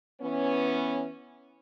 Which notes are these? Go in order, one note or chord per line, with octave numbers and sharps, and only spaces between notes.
E3 B3 C#4